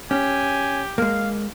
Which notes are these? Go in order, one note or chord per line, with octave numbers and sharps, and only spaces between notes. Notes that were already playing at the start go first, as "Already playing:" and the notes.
C#4 G4 G#5
G#3 A#3 F5